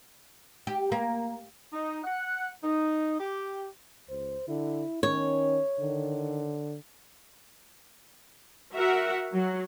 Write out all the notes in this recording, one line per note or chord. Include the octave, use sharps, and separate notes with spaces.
G4
A#3
D#4
F#5
D#4
G4
C#2 C5
D3 E4
D#3 C#4 C#5
D3 D#3
F#4 A#4 E5 F#5
F#3